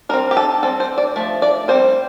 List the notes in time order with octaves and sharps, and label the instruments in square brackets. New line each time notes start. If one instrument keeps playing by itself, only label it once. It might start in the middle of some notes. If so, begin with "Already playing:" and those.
[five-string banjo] G3 A#4
C4
G4
A4
G3 C4 A4
C5
D5
F3 A3
D5
G3 C4 C5